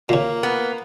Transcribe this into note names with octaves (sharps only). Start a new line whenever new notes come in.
A#2 C#3 A#3
B3